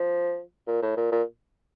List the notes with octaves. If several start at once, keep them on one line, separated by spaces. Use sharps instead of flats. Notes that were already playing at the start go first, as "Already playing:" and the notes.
Already playing: F3
A#2
A2
A#2
A#2